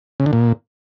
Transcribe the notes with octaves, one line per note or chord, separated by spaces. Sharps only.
C#3
D3
A#2